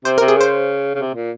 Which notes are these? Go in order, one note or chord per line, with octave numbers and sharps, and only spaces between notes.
C3 C5
A#4
C3
G#4
C#3 C5
C#3
C3
A#2